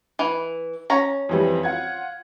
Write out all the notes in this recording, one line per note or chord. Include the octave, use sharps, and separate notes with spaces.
E3
C#4 A#5
F2 E3 G3
F4 F#5 G#6